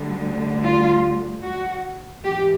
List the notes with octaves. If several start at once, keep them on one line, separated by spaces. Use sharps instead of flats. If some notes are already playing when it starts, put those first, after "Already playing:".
Already playing: D2 D3 G3
F4
F#4
G#2 E3 G4